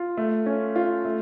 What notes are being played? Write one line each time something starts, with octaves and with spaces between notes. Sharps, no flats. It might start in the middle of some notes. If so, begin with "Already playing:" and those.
Already playing: F4
A3
C#4
F4
A3